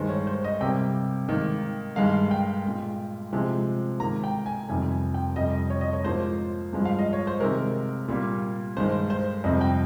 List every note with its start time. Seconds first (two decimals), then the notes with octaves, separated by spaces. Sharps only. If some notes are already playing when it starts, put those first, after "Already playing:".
Already playing: G2 D#3 G#3 C5
0.09 C#5
0.27 C5
0.44 D#5
0.61 C3 G3 A#3 G5
1.28 G#2 D#3 A#3
1.96 G2 D#3 G#3 F5
2.31 G5
2.65 A#2 G#3
3.33 C3 F3 G#3
4.00 G#2 D#3 A#3 A#5
4.24 G5
4.46 G#5
4.68 F2 C3 D#3 G3 G#5
4.91 G#5
5.14 G5
5.36 F2 C3 G3 D#5
5.70 C#5
5.81 D#5
5.93 C#5
6.04 G#2 F3 A#3 C5
6.73 G2 F3 G#3
6.85 F5
6.99 D#5
7.13 C#5
7.27 C5
7.40 C3 D#3 G#3 A#4
8.08 A#2 G3 A#3
8.77 G2 D#3 G#3 C5
9.10 C5
9.44 F2 C3 G3 D#5
9.61 G5